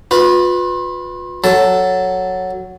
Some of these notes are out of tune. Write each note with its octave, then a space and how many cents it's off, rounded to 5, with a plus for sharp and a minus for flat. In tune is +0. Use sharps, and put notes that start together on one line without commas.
F4 +40 B4 +5
F#3 +0 A4 +0 A5 +0